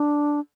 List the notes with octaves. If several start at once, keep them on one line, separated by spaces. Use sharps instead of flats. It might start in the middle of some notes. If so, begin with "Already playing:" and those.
Already playing: D4